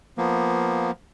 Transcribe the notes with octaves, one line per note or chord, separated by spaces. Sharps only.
F3 A#3 B3